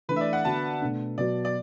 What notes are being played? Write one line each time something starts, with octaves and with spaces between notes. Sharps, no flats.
E3 A3 D4 B4
E5
D5
F#5
D3 B3 F#4 A5
B2 A3 D4
B2 F#3 B3 F#4 D5
D5